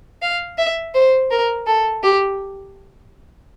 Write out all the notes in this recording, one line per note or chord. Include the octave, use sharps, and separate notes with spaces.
F5
E5
C5
A#4
A4
G4